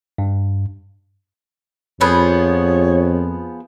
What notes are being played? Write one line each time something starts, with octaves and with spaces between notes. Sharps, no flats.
G2
F2 F3 B3 G#4 C#5